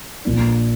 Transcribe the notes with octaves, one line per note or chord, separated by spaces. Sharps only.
A#1 A#2 F3 A#3 D4